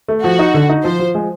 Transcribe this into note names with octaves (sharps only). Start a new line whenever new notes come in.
A3
F3 F#4
D#4
D3
D#4
F3 C5
F3
G#3